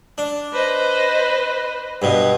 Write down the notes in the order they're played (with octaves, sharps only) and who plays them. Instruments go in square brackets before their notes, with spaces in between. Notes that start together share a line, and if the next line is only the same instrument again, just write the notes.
[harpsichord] D4
[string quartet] B4 C5 D#5
[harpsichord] G2 B2